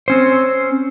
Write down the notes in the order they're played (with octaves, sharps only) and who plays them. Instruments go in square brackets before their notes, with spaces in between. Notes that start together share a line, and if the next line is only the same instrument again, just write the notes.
[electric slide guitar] C4 C#4 C5